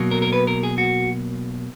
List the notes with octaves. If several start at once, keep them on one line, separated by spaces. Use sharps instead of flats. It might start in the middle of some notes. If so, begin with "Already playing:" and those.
Already playing: B2 F#3 A#3
A#4
A#4
B4
A#4
G#4
F#4